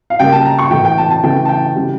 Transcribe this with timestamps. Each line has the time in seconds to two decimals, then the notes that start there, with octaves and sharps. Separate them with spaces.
0.10 F5
0.19 C#3 G3 A#3 G5
0.32 A5
0.45 A#5
0.59 C#6
0.71 A2 E3 A3 G5
0.85 G5
0.98 A5
1.11 A5
1.23 C#3 E3 A3 G5
1.45 A5
1.49 G5
1.76 C#3 G3